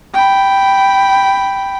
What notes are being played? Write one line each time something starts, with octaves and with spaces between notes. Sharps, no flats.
G5 B5